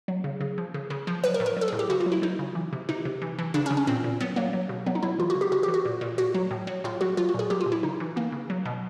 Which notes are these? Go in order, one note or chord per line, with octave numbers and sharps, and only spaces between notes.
F#3
C#3
C#3
F3
C#3
C#3
F3
F#3 B4
A#4
A2
A#4
F#3 A4
G#4
A2
G4
C#3 F#4
F4
F#3
E4
F#3 D#4
C#3
E3
C3
C3 D#4
C3
E3
E3
C#3 D4
C#4
C#3
C#4
A#2 C4
A#2
F#3 B3
F#3 A#3
F#3
B2
F#3 B3
D#4
F#3 E4
E3 F4
F#4
C#3
G4
C#3 F#4
G4
E3
F#4
A#2
A#2
A#2 F#4
F#3
A2
F#3
A2 F4
F#3 F#4
F#3 F4
F#4
A#2 G#4
F#3 G4
F4
A#2
E4
C#3 D#4
E3
E3 A#3
C#3
F#3
B2